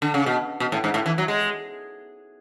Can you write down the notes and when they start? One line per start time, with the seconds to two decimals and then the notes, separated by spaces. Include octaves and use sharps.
0.02 D3
0.14 C#3
0.26 B2
0.60 B2
0.72 A2
0.84 G#2
0.94 A2
1.06 E3
1.18 F#3
1.28 G#3